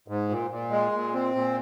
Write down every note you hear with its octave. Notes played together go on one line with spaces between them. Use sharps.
G#2
A#2
A#2
G#3
A#2
C4
A#2